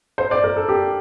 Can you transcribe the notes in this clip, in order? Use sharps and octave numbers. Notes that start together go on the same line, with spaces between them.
C5
D5
A#4
A4
G4